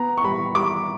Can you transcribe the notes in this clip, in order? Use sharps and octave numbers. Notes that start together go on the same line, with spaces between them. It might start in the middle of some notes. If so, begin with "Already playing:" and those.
Already playing: B3 A#5
C#6
G3 B5
G3 D6